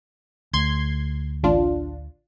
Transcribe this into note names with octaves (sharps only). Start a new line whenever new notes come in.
D2 C6 G#6
A1 D4 F4